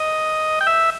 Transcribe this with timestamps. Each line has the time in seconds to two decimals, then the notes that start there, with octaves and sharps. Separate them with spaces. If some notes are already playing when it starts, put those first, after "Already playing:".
Already playing: D#5
0.61 G5
0.67 E5